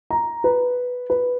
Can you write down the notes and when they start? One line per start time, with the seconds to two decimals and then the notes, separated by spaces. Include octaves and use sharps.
0.11 A#5
0.44 B4
1.10 B4